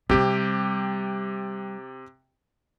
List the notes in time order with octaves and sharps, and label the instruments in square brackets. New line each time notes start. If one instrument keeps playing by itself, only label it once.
[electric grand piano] C3 G4 [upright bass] G3 C4